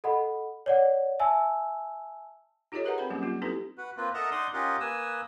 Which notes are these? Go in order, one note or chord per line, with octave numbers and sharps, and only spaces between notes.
A4 D#5 F#5 B5
C#5 D5 F#5
E5 G#5 A5 E6
D#4 F4 G4 A4 C#5 D#5
G#4 A#4 B4 E5 F#5 A#5
C4 B4 G5 B5
F#3 G3 A#3 C#4 G4
F#3 A#3 F4
C4 D#4 E4 G4 A4 B4
F#4 B4
A#3 C4 F4 B4
A4 A#4 D#5 E5 F#5 A#5
D#4 D5 F#5 C6 D6 D#6
C#4 F4 G4 A#4 D#5 F#5
A#3 B4 G#5 D#6 E6